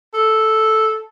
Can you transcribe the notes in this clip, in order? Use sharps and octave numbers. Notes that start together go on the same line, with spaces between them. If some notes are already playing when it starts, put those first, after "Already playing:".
A4